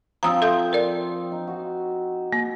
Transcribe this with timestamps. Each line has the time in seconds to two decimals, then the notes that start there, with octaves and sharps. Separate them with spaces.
0.23 F3 C4 G5 A#5 D#6 E6
0.42 A4 E5 G6
0.73 A#4 D5
1.32 D#4
1.48 F#4
2.33 A#3